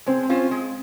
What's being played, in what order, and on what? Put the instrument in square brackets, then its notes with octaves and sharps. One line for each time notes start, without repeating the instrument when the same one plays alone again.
[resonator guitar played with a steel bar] G#3 [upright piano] C4
[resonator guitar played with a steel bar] C#4 F4 C5
G#3